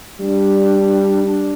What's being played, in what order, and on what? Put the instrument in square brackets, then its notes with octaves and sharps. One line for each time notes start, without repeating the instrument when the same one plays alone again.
[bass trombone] G3 [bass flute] D4
[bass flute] D4